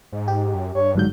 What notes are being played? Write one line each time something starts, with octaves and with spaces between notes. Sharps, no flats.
G#2
G4
F#2
G2 C#5
G1 G#2 F#3 G6